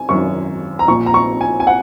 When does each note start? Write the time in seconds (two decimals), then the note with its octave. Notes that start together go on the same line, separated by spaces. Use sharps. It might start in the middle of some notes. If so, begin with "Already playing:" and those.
Already playing: G#5
0.09 G#1 F#2 D#3 C#6
0.79 A#5
0.88 A#1 A#2 C#6
1.06 A#5
1.14 C#6
1.41 G#5
1.60 G#5
1.67 F#5